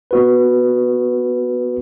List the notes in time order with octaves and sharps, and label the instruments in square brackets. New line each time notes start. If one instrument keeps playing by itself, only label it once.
[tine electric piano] B3 F#4 B4